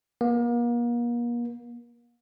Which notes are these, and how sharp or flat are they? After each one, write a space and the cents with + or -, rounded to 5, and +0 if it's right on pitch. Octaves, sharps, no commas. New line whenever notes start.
A#3 +40